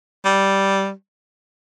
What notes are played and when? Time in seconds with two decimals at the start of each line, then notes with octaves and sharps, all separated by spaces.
0.25 G3